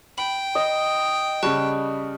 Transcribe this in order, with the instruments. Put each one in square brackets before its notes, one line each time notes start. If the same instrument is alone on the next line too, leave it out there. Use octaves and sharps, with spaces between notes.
[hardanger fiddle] G5 [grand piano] B5 [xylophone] F#7
[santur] D#5
[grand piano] C#3 G3 [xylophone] A5 C#6 F#6